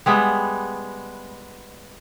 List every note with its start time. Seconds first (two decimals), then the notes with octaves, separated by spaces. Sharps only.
0.06 G3 G#3 B3 E5